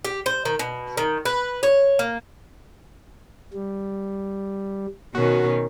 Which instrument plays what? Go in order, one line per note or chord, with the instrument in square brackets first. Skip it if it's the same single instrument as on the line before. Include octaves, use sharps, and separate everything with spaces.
[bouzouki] G4
C5
D#3
B2
D#3
B4
C#5
A#3
[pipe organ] G3
[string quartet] B2 D#3 C#4 [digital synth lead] F#4